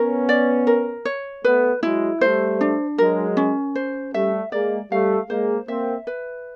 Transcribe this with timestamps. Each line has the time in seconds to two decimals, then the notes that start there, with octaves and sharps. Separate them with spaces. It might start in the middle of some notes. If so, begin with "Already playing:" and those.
Already playing: B3 C#4 A#4
0.29 D5
0.67 A#4
1.05 C#5
1.44 A3 B3 B4
1.82 F#3 G#3 E4
2.21 G3 A3 C5
2.61 D4
2.98 F#3 G#3 A#4
3.37 C#4
3.75 C5
4.14 G3 A3 E5
4.52 G#3 A#3 D5
4.92 G3 A3 F5
5.29 G#3 A#3 C5
5.68 A#3 C4 E5
6.07 B4